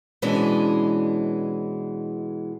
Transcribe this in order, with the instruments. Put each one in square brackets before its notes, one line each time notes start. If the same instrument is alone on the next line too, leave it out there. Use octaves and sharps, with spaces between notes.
[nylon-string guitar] B2 E3 G#3 C#4 D4